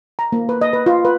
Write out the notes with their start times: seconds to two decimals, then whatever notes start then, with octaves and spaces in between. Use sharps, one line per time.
0.19 A#5
0.32 A#3
0.49 B4
0.61 D#5
0.73 B4
0.86 F4
1.05 B4